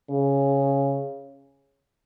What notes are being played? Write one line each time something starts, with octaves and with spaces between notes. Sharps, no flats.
C#3